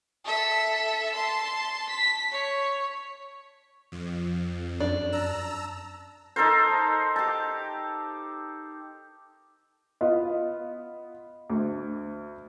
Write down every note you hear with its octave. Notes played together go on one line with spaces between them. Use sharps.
A4 E5
A5 C6
B6
C#5
F2
F#2 D4
A5 A#5 E6
D#4 A4 A#4 C5
G4 A5
B3 F4 D#5 F5
D2